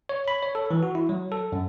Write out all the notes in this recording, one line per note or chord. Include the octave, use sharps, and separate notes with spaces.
C#5
B5
C#5
A4
E3
F#4
E4
F#3
A4
F#2